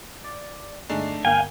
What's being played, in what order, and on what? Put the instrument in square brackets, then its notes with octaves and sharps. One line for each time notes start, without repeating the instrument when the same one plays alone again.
[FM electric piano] D5
[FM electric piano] G1 G#3 C7 [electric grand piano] A3 D4 D#4
[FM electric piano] G1 A#3 [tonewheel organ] F5 G5 [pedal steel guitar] G#5